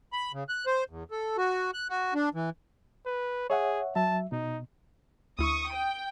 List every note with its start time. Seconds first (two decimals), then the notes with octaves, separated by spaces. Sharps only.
0.13 B5
0.33 C#3
0.49 F#6
0.66 C5
0.90 E2
1.11 A4
1.37 F#4
1.74 F#6
1.90 F#4
2.14 D4
2.34 E3
3.06 B4
3.50 G#4 C#5 E5 F#5
3.96 F#3 E5 A5
4.32 B2 D#4
5.39 D2 E4 C#6 D#6
5.71 G5